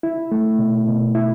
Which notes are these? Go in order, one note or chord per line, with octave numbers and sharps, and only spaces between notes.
E4
A3
B2
B2
E4